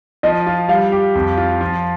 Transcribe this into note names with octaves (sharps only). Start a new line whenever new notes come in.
F3 D#5
F4
G3 F5
G4
F2
F4
F3